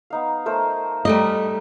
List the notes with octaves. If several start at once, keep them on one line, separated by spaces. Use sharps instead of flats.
B3 D#4 F5
A3 A#4 C5
G3 A3 A#4 D#5